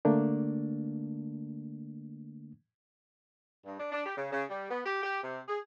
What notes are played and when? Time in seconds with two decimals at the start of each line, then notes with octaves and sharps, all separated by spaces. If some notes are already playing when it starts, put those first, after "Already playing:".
0.05 D3 A3 A#3 D4
3.65 G2
3.79 D4
3.92 D4
4.05 G4
4.17 C#3
4.32 C#3
4.50 G3
4.70 B3
4.85 G4
5.03 G4
5.23 C3
5.48 G#4